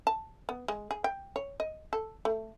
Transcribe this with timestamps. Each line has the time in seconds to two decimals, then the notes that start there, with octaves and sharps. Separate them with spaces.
0.07 A5
0.49 B3
0.68 G#3
0.91 G#4
1.04 G5
1.36 C#5
1.60 D#5
1.93 A4
2.25 A3